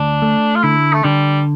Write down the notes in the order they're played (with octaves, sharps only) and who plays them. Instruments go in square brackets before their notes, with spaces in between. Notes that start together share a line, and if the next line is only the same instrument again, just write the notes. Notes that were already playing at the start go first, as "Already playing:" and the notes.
Already playing: [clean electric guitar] D2 [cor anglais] D4
[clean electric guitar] A3
[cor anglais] F4
[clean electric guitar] D3 [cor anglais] E4
[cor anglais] A3
[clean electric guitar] D3 [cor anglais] G3